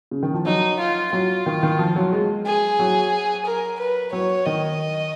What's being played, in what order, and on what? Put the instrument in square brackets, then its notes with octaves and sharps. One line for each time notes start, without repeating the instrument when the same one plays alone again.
[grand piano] C#3
D#3
F3
[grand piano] F#3 [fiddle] D#4
[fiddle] F4
[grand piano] F#3 [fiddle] F4
[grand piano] D#3
D#3
F3
F#3
G#3
[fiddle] G#4
[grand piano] F#3
[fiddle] A#4
B4
[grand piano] F#3 [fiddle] C#5
[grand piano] D#3 [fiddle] D#5